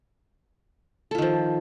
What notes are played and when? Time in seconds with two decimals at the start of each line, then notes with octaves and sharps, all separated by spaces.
1.11 A4
1.15 F4
1.18 D#3
1.22 F3